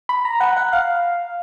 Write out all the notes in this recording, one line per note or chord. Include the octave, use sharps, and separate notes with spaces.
B5
A#5
F#5
F#5
F5